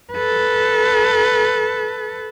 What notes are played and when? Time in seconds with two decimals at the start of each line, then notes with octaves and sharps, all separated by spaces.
0.13 A4 B4